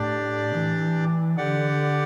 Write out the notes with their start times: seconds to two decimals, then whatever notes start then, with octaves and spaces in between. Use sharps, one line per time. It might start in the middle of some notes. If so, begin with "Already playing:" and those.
Already playing: A2 D4 G4 D5
0.54 E3
1.38 D3 G4 D5 F#5